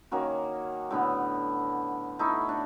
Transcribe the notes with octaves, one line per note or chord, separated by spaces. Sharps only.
D#3 A#3 C#4 F#4
A2 D3 B3
A3 D#4 E4 C#6
D4